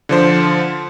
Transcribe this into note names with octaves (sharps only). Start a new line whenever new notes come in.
D3 F3 C5